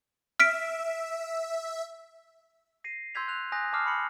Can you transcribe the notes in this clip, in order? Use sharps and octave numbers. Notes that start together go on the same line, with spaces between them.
E5 F6 B6 D7
A#6 C7 D#7
C6 E6 G6 G#6 B6 F7
F#6 F7
G#5 D#6 F#6 G6 A#6
G#5 A5 D6 D#6 F6 C7
B5 B6 C#7 F#7